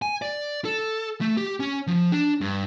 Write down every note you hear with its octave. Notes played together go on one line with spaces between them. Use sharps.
G#5
D5
A4
A3
G4
C#4
F3
D4
G2